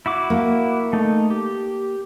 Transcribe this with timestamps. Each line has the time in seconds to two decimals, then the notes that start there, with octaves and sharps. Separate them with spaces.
0.06 E4 F#4 D6
0.30 A#3
0.93 A3 D#4
1.30 G4